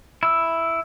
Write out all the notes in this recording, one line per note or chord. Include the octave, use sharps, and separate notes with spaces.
E4 E6